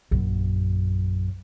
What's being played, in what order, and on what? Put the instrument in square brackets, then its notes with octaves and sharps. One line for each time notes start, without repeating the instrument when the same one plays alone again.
[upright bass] A#1 F#2